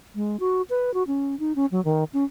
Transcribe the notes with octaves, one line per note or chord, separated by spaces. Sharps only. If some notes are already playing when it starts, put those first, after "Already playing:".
G#3
F#4
B4
F#4
C#4
D#4
C#4
F#3
D#3
C#4